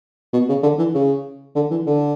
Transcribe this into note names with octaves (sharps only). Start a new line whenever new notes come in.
B2
C#3
D3
E3
C#3
D3
E3
D3